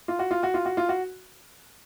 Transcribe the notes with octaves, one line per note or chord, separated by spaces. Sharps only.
F4
F#4
F4
F#4
F4
F#4
F4
F#4